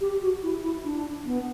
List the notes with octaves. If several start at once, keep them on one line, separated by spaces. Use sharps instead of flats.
G4
F#4
E4
E4
D4
B3